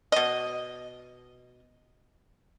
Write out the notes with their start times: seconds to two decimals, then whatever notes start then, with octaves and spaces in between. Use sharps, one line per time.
0.12 B2 D#5